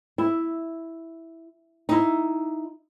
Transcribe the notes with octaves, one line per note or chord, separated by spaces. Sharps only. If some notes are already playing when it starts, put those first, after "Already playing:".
E4
D#4 E4